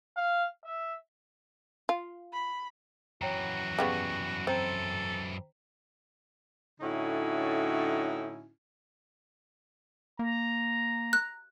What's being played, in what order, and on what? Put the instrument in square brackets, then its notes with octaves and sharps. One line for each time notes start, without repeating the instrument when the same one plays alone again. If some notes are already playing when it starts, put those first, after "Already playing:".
[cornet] F5
E5
[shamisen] F4
[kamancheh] B5
[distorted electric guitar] F#2 E3 [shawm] F#4 [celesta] C#5 G5 A#5
[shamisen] C#3 G3 B3 [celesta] G5 A5 C#6
[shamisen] C4 [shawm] A4 [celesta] C5 G5 A#5
[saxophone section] A2 D3 C#4 D#4 E4 F#4
[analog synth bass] A#3 [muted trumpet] A#5
[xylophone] F#6